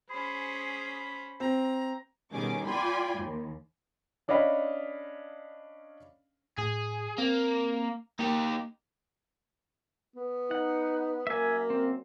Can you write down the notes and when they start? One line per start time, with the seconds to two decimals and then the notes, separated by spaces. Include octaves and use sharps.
0.10 C#4 G#4 C5 B5
1.40 C4 A#5
2.33 B2 D#3 G3 C#4 G#4 D6
2.65 F4 D5 G5 G#5 B5 C6
3.18 D#2
4.28 C#4 D4 C#5 D#5 F5 B5
6.58 A2 G#4
7.18 A#3 C4
8.19 A#3 D#4 G4
10.16 B3
10.51 D#4 F#5
11.27 F#2 A#3 E5 G#5
11.70 C4